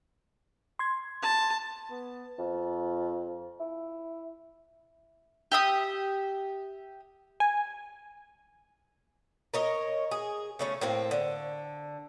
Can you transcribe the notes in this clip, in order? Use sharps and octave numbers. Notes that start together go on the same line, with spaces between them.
C6 G#6
A5
B3
F2
E4
G4 E5 D#6
G#5
A#4 C#5 D#5
G#4
C#3 A3 C#4
A2 A#3 C4
D3